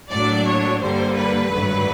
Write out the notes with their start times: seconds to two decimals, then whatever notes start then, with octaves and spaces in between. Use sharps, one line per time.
0.11 A2 F#3 A#3 D4 D5
0.47 C#5
0.81 G2 D3 G3 A#3 C5
1.16 B4
1.52 G#1 G2 D3 F#3 A3